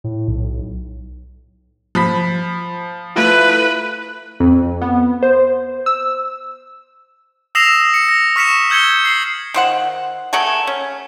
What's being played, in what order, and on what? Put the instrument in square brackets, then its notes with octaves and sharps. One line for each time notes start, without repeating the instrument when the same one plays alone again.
[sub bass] A2
B1
[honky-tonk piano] F3 B5 B6
[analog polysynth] A3 E4 F4 [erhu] B4
[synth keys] F2
B3
C5
E6
[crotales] D#6 E6 A#6 C7 E7 F7
C#7
A#6
C#6 F6 B6 C#7 E7
E6 G6 G#6 C#7 G7
C7 F#7
[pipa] D#3 C5 F#5
A3 G#4 A#4 F#5
C#4